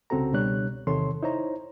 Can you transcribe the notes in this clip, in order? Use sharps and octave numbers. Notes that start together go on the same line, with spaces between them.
C2 C#3 C4 F#4 A4 A#5
C#2 B2 G3 D4 C#5 F#6
E2 C3 D#3 A4 C#5 C6
D#4 E4 C5 C#5 A#5